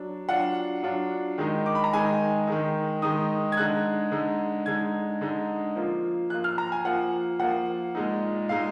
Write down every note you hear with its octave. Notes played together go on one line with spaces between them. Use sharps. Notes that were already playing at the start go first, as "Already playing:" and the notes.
Already playing: F#3 D4
F#3 D4 F4 F#5
F#3 D4 F4
D#3 G#3 D#4
D6
B5
A#5
D#3 G#3 D#4 G#5
D#3 G#3 D#4
D#3 G#3 D#4 D#6
G#6
D3 G#3 D#4 F#6
D3 G#3 D#4
D3 G#3 D#4 G#6
D3 G#3 D#4
F3 A#3 F4
F3 A#3 F4 F#6
F6
A#5
G#5
F3 A#3 F4 F#5
F3 A#3 F4 F#5
A#2 G#3 D#4
A#2 G#3 D#4 F5